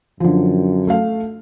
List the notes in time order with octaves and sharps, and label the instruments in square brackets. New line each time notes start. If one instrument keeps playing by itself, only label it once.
[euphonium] F#2 [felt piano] D3 F3
[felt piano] A3 A4 F5